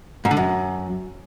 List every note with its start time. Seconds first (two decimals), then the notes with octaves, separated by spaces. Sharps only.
0.25 G#2
0.31 D3
0.37 F#2